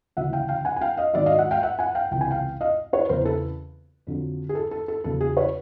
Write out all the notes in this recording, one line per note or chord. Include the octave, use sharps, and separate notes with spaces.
D2 C#3 E3 E5 F#5
F5 G5
F5 G5
F#5 G#5
G#5
F5 G5
D#5 F5
G#2 D#3 F#3 D5 E5
D#5 F5
E5 F#5
F5 G5
E5 F#5
F#5 G#5
F5 G5
C#2 C3 E3 G5
G#5
F5 G5
D#5 F5
B4 C#5
E2 C#3 E3 A#4 C5
A4 B4
F2 D3 F#3
G#4
A4
A4
A4
E2 C#3 F#3 A4
G#4
B4 C#5